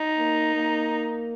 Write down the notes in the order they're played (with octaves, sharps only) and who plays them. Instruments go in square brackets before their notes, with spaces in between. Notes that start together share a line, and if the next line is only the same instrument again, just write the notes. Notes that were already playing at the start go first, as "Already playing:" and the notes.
Already playing: [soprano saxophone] D#4
[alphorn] A#3
A#3